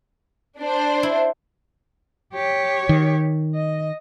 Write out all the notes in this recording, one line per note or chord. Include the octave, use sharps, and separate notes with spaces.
D4 C5
E4
G4 C#5
D#3
D#5